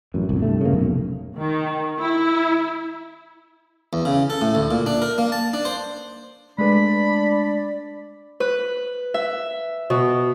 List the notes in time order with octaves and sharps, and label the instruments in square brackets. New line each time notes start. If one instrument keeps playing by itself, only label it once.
[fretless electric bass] A1 F#2
G1 C2
G2 A3
C#3 A#3
F1 B1
[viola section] D#3
E4
[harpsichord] E2
C#3
A4
A2
D2
A#2
D4
A#4
A#3
A5
D4
C5
[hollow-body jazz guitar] G#3 A3 B4 [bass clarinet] D4 [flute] D5 [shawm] B5
[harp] B4
E5
B2